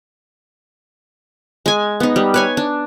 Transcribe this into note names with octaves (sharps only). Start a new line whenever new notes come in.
G#3 G#5
B3 D#4
G3
B4 C#5 G#5
D4